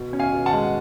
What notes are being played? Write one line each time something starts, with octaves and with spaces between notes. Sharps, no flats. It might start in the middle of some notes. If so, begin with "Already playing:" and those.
Already playing: B2
C#4
F5 G#5
B2
F#5 A5
G#3